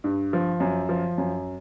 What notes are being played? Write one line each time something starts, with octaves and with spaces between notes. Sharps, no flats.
G2
F3
F#2
F3
F#2